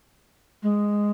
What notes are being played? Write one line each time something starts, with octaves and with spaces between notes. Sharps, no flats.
G#3